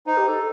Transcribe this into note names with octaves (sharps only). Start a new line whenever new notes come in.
D#4 C5
G4
A4